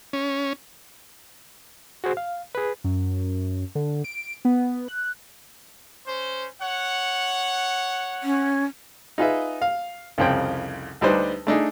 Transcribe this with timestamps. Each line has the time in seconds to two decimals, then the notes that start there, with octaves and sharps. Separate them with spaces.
0.13 C#4
2.04 F#4 G#4 C5
2.17 F5
2.55 G#4 B4
2.84 F#2
3.75 D3
4.04 D7
4.45 B3
4.88 F#6
6.07 C#4 C5
6.60 C#5 F#5
8.23 C#4
9.18 D#4 F4 G#4 B4 D#5 E5
9.62 F5
10.18 C2 F2 C#3 C5 G5
11.01 D2 G3 D4 D#4 B4 C5
11.47 A3 D4 D#4 G#4